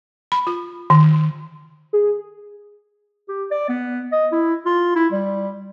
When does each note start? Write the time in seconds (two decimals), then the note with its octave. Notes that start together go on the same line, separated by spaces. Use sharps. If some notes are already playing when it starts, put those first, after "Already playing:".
0.32 B5
0.47 F4
0.90 D#3
1.93 G#4
3.28 G4
3.51 D5
3.69 B3
4.12 D#5
4.32 E4
4.66 F4
4.95 E4
5.12 G3